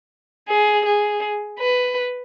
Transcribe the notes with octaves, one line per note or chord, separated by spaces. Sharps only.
G#4
G#4
B4